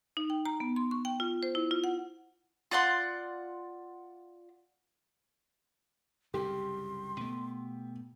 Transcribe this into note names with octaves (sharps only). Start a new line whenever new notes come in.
D#4
G5
A#5
B3
C6
C#6
G5
F4
C5
E4
F4
F#5
F4 D5 F#5 C6
C2 F#2 C#3 G4 C6
B2 A3 B3